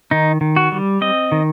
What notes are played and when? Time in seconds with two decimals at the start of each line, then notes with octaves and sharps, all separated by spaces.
0.11 D#3 D#4
0.41 D#3
0.56 F#4
0.72 G3
1.01 C4 D#5
1.32 D#3